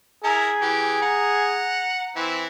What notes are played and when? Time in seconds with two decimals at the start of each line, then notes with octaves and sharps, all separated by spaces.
0.24 E4 G#4 A#4 A#5
0.62 E3 G4
1.02 F#5 A#5
2.16 E3 C4 E4